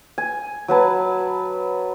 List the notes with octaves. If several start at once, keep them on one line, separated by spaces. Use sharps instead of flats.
G#5
F#3 B4 A5